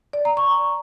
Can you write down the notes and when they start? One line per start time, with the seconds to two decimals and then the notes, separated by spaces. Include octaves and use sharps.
0.13 D5
0.25 A#5
0.37 C#6